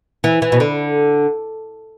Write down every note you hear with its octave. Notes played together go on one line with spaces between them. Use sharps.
E3
E3
B2
D3